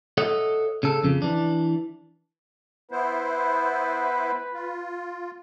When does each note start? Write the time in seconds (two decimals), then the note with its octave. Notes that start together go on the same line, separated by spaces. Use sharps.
0.18 A4 C#5 D#5 E5 F#5
0.83 C#3 A4
1.03 F2 C#3
1.22 E3 D4
2.91 B3 E4 B4 C5
4.54 F4